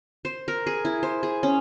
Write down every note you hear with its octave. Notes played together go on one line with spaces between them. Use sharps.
C5
A#4
G#4
E4
C5
G#4
C#4